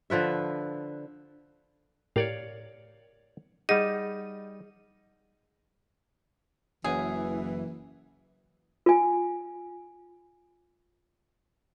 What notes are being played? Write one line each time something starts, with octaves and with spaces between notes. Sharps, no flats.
D3 F3 B4 E5
A2 G4 A#4 C#5 D5 F5
G3 D#4 G#4 D#5 F#5
F#1 F#2 E3 G#4
F4 G#5